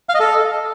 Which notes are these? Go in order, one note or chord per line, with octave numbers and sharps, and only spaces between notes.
F5
D#5
A4